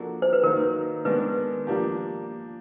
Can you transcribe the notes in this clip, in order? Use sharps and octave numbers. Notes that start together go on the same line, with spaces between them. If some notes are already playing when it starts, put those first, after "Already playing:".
Already playing: F3 A#3 D4 F#4 A4
C5
B4
D#3 F#3 A#3 D#4 A#4
D#3 G#3 B3 D4 B4
F3 A#3 D4 G4